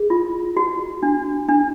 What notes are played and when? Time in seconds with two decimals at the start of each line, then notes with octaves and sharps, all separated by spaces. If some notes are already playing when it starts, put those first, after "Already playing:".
Already playing: G#4
0.10 F4
0.57 F#4
1.03 D4
1.49 D4